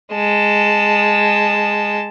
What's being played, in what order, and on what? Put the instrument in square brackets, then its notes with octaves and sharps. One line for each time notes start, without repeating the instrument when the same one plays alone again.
[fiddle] G#3 A5